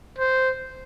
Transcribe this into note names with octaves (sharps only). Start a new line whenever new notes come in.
C5